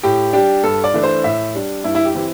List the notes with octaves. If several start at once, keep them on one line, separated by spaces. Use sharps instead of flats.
A2 G4
G3 D4 G4
G2 A4
D5
E3 A3 D4
C5
A2 E5
G3 D4
G2 E4
E4
G4
E3 C4 E4